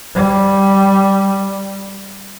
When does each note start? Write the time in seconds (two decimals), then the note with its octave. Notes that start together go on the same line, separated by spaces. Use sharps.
0.15 G3